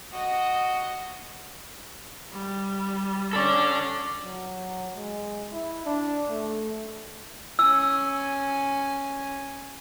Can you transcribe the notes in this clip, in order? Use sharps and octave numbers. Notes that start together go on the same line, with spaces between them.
F#4 D#5
G3
C#4 A4 D5
F#3
G#3
E4
D4
A3
C#4 G#5 E6